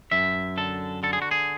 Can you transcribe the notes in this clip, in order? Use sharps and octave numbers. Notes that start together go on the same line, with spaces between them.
F#2 E5
D3 A4
D3 A4
G#4
F#4
G#4